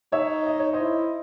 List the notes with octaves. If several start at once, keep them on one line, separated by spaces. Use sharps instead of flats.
D#4 C#5 E5
D#5
C#5
C5 D#5
E4